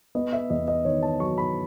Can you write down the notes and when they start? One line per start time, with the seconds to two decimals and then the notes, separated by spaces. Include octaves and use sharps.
0.15 B3 D#5
0.33 E5
0.50 E2 D#5
0.68 D#5
0.85 D#3 C#5
1.03 A5
1.20 F#3 C#6
1.38 B5